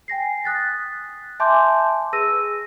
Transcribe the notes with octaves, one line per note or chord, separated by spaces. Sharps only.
G5 G#5 A#6 C7
D#6 F#6 A6 B6
E5 G#5 A5 C6 D6 G6
G#4 B4 E6 A#6 D#7